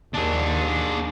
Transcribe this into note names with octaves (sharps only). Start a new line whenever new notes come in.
D#2 D4 G#4